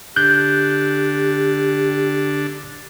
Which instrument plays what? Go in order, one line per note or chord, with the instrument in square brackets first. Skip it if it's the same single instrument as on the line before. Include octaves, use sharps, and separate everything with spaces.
[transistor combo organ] D3 D4 [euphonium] G4 [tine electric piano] F#6 G6